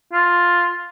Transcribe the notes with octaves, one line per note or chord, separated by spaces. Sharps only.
F4